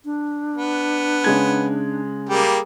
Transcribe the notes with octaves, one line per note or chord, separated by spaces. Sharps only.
D4
B3
C#3 G#3 G#6
G3 A#3 G4 G#4